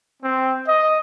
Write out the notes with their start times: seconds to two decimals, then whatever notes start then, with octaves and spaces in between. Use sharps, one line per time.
0.21 C4
0.67 D#5